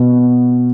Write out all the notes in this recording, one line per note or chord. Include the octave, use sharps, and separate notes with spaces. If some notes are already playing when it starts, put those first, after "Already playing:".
Already playing: B2